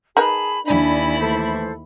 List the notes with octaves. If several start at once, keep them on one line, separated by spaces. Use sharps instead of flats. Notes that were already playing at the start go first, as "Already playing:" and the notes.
D#4 G#4 A#4 B4 A5 B5
D#2 D4 E4 G#5 B5
E3 A3 A4 C5